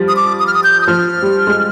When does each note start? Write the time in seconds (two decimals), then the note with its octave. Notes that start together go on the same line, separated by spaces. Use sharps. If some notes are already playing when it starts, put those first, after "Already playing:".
Already playing: F3 G3
0.08 D#6
0.16 D6
0.39 D#6
0.47 F6
0.54 D#6
0.64 G6
0.81 D#6
0.87 F3 F6
1.22 G3
1.47 G#3